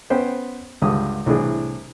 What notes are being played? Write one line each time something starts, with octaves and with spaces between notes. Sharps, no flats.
B3 C#4 C5 G5
C#2 G2 D3 D#6
C2 A2 E3 D4 G#4